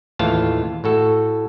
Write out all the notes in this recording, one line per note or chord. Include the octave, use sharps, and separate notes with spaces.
D#2 A2 E3 F4 F5 A5
A2 F#4 A4